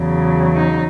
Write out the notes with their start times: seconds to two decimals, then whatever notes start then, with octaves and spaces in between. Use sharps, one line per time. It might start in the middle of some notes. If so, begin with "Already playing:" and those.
Already playing: E2 C#3 F#3
0.55 D#4